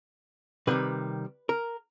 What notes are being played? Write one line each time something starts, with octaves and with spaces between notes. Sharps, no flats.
C3 D#3 G3 B4
A#4